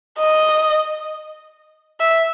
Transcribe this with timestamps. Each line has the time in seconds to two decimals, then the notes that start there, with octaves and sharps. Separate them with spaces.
0.19 D#5
2.01 E5